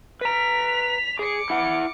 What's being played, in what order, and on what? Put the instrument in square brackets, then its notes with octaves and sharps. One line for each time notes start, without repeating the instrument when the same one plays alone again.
[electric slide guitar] B4 A#5 [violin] B6 F7
[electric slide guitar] G#4 [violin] D6 C#7
[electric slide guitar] E4 F#5